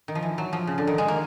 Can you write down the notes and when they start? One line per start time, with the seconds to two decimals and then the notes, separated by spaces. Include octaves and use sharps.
0.08 D#3
0.15 F3
0.23 E3
0.38 F#3
0.53 F3
0.67 C#3
0.78 D3
0.87 D#3
0.98 G#3
1.08 A#3